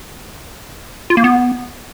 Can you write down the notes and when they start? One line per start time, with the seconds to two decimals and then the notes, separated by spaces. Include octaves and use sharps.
1.10 F4
1.17 A#3
1.24 B3